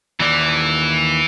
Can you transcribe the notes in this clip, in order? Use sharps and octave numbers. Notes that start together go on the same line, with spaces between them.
D#2 E3 D5